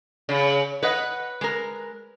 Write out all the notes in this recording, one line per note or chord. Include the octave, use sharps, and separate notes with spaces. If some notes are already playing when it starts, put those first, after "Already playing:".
C#3
B4 C#5 D#5 F#5
G#3 A#4